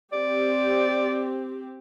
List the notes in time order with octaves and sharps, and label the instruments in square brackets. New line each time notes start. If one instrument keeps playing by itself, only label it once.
[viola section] C4 G4 [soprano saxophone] D5